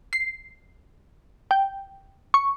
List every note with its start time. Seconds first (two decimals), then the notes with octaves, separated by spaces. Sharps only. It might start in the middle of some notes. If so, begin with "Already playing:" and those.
0.13 C7
1.51 G5
2.34 C#6